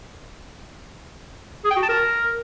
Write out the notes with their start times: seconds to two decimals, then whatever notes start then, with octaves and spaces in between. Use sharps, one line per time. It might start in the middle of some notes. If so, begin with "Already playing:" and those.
1.65 G#4
1.71 G5
1.77 F#4
1.83 A5
1.89 A#4